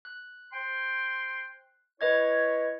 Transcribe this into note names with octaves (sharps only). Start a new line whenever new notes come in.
F#6
C5 G5 C6
E4 B4 C#5 D#5 G#6